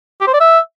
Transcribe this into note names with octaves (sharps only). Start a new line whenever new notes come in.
G4
C5
D5
E5